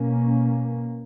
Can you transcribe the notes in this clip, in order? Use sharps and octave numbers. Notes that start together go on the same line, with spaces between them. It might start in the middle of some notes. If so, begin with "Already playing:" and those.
Already playing: B2 A#3 C#4